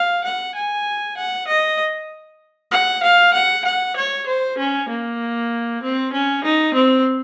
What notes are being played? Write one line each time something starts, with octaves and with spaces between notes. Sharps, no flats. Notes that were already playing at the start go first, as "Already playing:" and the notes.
Already playing: F5
F#5
G#5
F#5
D#5
F#5
F5
F#5
F#5
C#5
C5
C#4
A#3
C4
C#4
D#4
C4